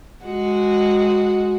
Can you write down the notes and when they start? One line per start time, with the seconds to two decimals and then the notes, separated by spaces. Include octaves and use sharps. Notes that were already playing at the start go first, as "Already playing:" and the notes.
0.25 G#3 F#4